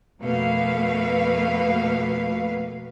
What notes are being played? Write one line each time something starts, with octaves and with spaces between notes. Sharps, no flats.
F2 B2 A3 A#3 B4 F5